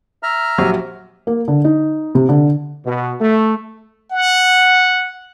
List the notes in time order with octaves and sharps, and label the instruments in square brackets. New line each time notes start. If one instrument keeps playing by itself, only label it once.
[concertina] E5 A#5 F6
[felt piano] A#1 F#3 G4
A#3
D3
D#4
C3
D3
[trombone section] B2
A3
[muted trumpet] F#5